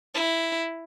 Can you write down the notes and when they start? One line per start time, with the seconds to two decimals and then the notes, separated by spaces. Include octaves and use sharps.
0.14 E4